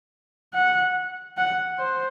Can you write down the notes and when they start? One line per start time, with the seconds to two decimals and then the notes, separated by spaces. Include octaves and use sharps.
0.54 F#5
1.37 F#5
1.78 C5